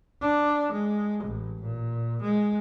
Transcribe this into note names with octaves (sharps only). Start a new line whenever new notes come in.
D4
G#3
A1
A#2
G#3